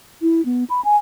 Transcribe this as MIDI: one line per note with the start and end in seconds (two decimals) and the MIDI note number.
0.22 0.44 64
0.45 0.64 59
0.70 0.81 83
0.84 0.96 80